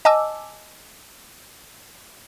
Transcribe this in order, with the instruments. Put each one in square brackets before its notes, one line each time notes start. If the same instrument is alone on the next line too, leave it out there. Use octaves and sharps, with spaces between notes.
[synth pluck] D#5 G#5 A5 D6 E6